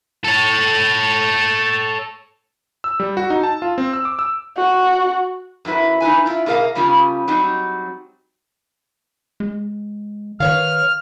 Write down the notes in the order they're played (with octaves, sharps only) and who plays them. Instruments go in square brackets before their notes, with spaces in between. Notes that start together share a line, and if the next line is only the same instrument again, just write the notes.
[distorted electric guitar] A4 C#5
[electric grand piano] E6
G3
F#4
D#4
A5
F4
C4
E6
D6
E6
[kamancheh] F#4
[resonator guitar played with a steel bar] F#2 F#3 E4 B4
D#4 E4 B4 G#5
E4 F4
B2 A#3 G#4 A#4 E5 F5
C#3 G3 A#3 C#4 F4 G4
F#3 G3 C4 D#4
[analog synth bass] G#3
[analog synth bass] D#3 [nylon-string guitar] B4 C#5 F5 [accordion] F6